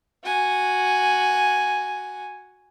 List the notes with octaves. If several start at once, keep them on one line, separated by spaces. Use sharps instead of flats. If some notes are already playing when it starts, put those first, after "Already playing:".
F#4 G#5